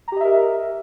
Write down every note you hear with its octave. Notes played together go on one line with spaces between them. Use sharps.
G4 A#4 D#5 E5 A#5